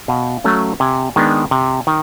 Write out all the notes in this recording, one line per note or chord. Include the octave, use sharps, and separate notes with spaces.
B2 F5
F#3 A3 C#4
C3 G#5
D#3 G#3 B3 D4
C3
D#3